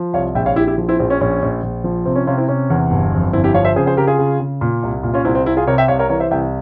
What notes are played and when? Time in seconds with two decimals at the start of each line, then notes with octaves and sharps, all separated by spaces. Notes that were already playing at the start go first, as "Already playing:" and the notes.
Already playing: F3
0.13 C2 C#5 F5
0.35 A#1 E5 G5
0.46 C#5 F5
0.56 A#1 E4 G4
0.67 E4 G4
0.78 F3
0.89 C4 E4
0.99 A#1 C4
1.10 C#4
1.21 A#1 C#4
1.42 A#1
1.63 A#1
1.84 F3
2.05 C3 C4
2.16 C#4
2.27 C3 C#4 F4
2.38 C4 E4
2.48 C3 C#4
2.70 E2
2.91 G1
3.12 F2
3.33 G1 C4 E4
3.44 E4 G4
3.54 F3 C#5 F5
3.65 C5 E5
3.76 C#3 G#4 C5
3.86 G#4 C5
3.97 C#3 G4 A#4
4.07 F4 G#4
4.19 C#3
4.40 C#3
4.61 A#2
4.83 C2
5.03 A#2
5.14 C#4 F4
5.25 C2 C4 E4
5.35 C4
5.46 C2 C4 E4
5.57 F4 G#4
5.67 C3 A#4 C#5
5.78 E5 G5
5.88 C2 C#5 F5
5.99 A#4 C#5
6.10 E3 A#4 C#5
6.20 C5 E5
6.31 C2 E5 G5